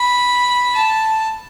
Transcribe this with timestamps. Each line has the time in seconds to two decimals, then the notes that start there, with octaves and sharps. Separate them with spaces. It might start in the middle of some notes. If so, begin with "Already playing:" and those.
Already playing: B5
0.74 A5